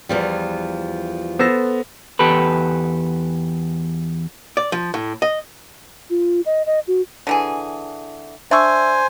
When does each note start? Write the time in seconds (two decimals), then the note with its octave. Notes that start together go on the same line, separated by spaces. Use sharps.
0.09 E2 F3 G3
1.39 B3 A4 C5 A#6
2.19 E2 G4 A4 B4
4.57 D5
4.72 F3
4.94 A2
5.22 D#5
6.10 F4
6.46 D#5
6.66 D#5
6.87 F#4
7.27 D3 E3 G#4
8.51 D4 C5 E5 G#5 C#6 E6